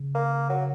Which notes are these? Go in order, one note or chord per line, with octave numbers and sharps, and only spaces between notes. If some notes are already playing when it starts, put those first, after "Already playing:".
Already playing: C#3
A#3
F#3